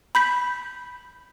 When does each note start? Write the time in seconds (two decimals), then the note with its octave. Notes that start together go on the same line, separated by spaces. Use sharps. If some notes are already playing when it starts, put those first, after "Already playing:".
0.15 B5 G6 B6